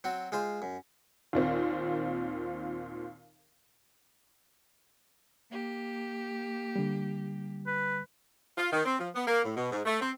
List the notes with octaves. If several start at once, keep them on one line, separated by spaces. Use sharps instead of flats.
F#3 C4 F#4
G#3 F4 C5
F#2
D#2 A#2 C4
A#3 G4
D3 G3
B4
F4
D#3
C4
F3
B3
A#3
A2
B2
G#2
A3
C4